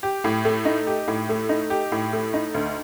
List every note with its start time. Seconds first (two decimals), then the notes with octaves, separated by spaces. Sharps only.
0.03 G4
0.24 A2
0.45 A3
0.65 D#4
0.87 G4
1.08 A2
1.29 A3
1.49 D#4
1.70 G4
1.92 A2
2.13 A3
2.34 D#4
2.54 D2